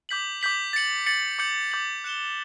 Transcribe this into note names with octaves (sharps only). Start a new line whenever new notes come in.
D6 G6 B6 F#7
D6 G6 B6 F#7
A6 C#7 F#7
A6 C#7 F#7
D6 G6 C#7 F#7
D6 G6 C#7 F#7
F#6 C#7 E7 G7